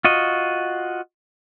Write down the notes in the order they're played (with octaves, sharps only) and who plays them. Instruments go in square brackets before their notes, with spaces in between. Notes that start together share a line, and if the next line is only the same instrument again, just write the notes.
[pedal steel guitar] F4 F#4 D#5